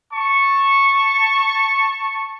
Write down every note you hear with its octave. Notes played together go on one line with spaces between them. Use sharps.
A5 C#6